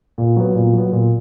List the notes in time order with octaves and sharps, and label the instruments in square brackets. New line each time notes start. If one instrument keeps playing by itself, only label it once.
[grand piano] A#2
F#3 B3
A#2
F#3 B3
A#2